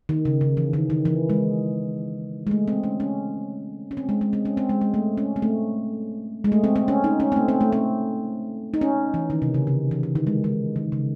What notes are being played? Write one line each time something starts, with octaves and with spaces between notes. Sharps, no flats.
D#3
C#3
C#3
E3
D#3
D#3
E3
G#3
G#3
A3
C4
C#4
C#4
C#4
C4
G#3
G#3
C4
C#4
C4
G#3
G#3
A3
C#4
C4
A3
G#3
A3
C4
C4
C#4
D#4
C#4
C4
A3
C4
A3
C4
D#4
C#4
E3
D#3
C3
C#3
C#3
E3
E3
D#3
G#3
G#3
D#3
C#3